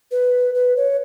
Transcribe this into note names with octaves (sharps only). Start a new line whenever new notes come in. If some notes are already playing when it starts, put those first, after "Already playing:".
B4
B4
C#5